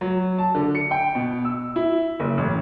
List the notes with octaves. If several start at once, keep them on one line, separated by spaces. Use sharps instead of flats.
F#3
A5
D3
C#7
G5
B2
E6
E4
F#1
A1